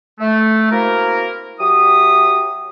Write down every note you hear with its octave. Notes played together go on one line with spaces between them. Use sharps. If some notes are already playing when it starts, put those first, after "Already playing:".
A3
A#3 C4 E4 F#4 A#4
F#3 G4 E5 D#6